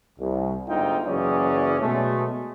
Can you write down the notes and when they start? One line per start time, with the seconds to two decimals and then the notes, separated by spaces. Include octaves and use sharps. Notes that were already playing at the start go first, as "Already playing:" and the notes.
0.19 C2
0.68 G1 D2 G#2 D#4 F4 G5
1.06 F#1 E3 F#3 C#4 G#4 D5
1.80 B2 F#3 G#3 A3